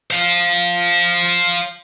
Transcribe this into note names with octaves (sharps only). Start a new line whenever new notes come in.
C5 F5